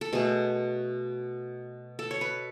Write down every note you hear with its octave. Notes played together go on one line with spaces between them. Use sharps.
A4
B2 A3 G#4
A4
C#5
B4